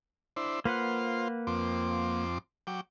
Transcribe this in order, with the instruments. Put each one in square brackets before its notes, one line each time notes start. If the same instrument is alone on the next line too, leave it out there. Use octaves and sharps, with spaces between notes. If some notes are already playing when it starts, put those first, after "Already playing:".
[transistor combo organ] D4 E4 C5
[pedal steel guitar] A#3 B4 F#5 [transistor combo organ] F4 C5
[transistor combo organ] F2 C4 D6
F#3 G5 D6